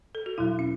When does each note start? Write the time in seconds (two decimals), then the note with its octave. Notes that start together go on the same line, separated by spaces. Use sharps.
0.15 A4
0.26 F#4
0.38 E2 B2 F#3 E4
0.59 C#4